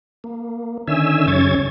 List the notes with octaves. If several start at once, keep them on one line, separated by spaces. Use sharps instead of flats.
A#3
D3 D#3 C#4 E5 G#5 E6
F#2 C#3 C#4 C#5 G#6 A6